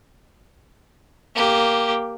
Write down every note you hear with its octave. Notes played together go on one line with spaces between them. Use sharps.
A#3 G4